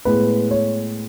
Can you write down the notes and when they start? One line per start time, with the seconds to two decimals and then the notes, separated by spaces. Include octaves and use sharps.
0.05 A2 G#3 B3 B4
0.51 C#5